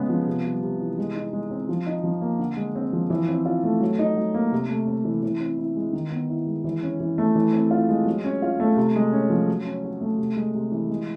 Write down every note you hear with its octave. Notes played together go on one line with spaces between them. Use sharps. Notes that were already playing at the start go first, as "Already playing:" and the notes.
Already playing: C#3 G#3 B3
F3
C3
G3
C3
E3
G#3
D#4
G#3
C4
F3
D#4
F3
A#3
D3
G#3
C4
F3
E3
C4
F4
A3
F#3
D#4
F#3
A#3
C3
A3
C4
E3
E3
C4
E4
G#3
D#3
B3
E4
G#3
E3
C#4
E3
A3
E3
C4
F4
G#3
F#3
C#4
F4
A3
C3
G#3
C#4
F3
F#3
C#4
F#4
A3
C3
G#3
C3
E3
G#3